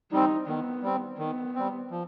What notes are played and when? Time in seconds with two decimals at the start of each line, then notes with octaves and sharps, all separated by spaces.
0.11 G3 C4 D#4
0.47 D#3 B3
0.83 G3 C4
1.19 D#3 B3
1.55 G3 C4
1.91 F3